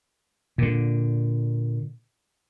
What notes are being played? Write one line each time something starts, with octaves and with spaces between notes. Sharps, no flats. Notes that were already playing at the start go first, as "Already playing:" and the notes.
A#2 D3